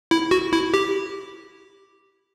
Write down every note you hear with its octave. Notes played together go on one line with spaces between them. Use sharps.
E4
F#4
E4
G4